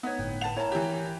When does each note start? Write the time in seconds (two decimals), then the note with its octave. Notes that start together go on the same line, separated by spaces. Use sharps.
0.03 B3 D#4 C#5
0.19 G1 A2 G5
0.41 B4 F#5 A5 F7
0.57 E4 A#4 C#5 G#5 A#5
0.72 E3 G4